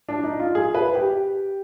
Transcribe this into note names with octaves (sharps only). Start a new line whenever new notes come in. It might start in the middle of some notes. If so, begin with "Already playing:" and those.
D4
D#4
F4
G#4
B4
G4